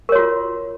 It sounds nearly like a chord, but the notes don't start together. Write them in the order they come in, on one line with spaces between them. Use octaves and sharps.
A#4 C#5 F#4 F4